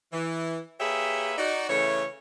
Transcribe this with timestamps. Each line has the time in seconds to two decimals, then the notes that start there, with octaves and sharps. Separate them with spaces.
0.13 E3
0.80 A#3 G4 G#4 B4 C#5 E5
1.38 D#4 F#4 D5
1.70 C#3 E3 A3 C#5